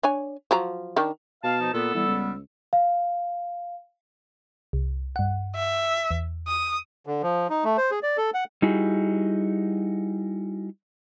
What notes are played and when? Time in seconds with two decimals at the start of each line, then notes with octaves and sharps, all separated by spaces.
0.03 D4 C#5 G#5
0.51 F3 F#3 A#5
0.96 D#3 D4
1.44 B2 F5 A5
1.60 F3 D#4
1.74 A#2 B3 A4
1.95 E3 G3 B3 E6
2.07 C#2
2.73 F5
4.73 C2
5.16 G2 F#5
5.55 E5
6.11 E2
6.47 D#6
7.07 D3
7.22 F3
7.50 D#4
7.64 A3
7.78 C5
7.91 G#4
8.03 D5
8.17 A4
8.34 F#5
8.62 G3 D#4 E4 F#4 G#4